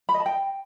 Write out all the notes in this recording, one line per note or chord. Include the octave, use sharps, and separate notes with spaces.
B5
D#5
A5
G5